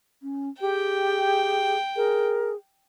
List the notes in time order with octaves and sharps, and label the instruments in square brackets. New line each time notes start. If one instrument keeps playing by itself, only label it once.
[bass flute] C#4
[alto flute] G4 [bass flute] G#4 [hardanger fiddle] G5
[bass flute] G#4 [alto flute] A#4